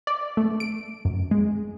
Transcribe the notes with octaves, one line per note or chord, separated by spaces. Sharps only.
D5
A3
D7
F#2
G#3